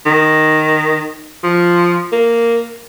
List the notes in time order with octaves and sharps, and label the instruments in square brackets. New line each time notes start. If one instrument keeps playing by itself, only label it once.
[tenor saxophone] D#3
F3
A#3